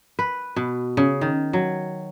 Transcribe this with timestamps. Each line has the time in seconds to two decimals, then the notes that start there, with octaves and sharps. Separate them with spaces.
0.19 B4
0.56 B2
0.97 C#3
1.21 D#3
1.53 F#3